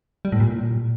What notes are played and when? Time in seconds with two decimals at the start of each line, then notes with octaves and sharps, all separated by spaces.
0.25 G3
0.32 A2
0.40 A#2